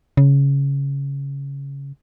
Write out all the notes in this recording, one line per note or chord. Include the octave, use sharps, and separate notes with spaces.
C#3